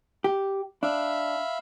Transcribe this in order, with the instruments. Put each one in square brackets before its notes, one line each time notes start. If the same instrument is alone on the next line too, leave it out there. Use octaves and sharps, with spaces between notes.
[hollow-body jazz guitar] G4
[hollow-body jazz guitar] D4 [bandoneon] E5 F5 B5